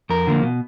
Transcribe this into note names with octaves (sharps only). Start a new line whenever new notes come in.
F2 A#4
D3 F3 A#3
B2